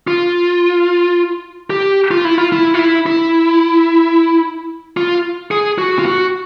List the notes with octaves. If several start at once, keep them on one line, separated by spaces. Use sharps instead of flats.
F4
G4
F4
E4
F4
E4
F4
E4
E4
F4
G#4
F#4
F4
F#4